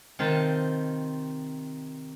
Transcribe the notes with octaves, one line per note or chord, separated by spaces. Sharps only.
C3 D#3 F4 A5